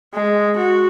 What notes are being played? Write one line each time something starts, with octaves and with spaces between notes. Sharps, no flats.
G#3
F#4